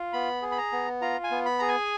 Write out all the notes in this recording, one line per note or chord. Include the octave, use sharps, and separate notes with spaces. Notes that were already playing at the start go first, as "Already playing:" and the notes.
Already playing: F4
B3 B5
G#4
B5
A#5
B3
F4 A#5
G#5
B3
B5
G#4 A#5
G#5